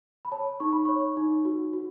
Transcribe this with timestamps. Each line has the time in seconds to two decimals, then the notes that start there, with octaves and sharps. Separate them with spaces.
0.25 B5
0.32 C#5 A5
0.60 D#4 C#6
0.73 B5
0.85 C#5 C#6
1.17 D#4
1.45 F#4
1.73 F#4